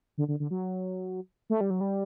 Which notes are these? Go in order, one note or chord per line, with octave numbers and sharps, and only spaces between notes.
D3
D3
D3
F#3
A3
G3
F#3
G3